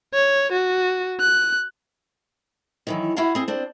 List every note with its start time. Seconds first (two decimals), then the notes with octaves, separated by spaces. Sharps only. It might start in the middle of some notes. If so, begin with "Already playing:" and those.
0.14 C#5
0.52 F#4
1.20 F#6
2.87 D#3 E3 F#3
3.16 E4 F#4 G4 F5 F#5
3.35 C4 G#4
3.48 C4 D4 C5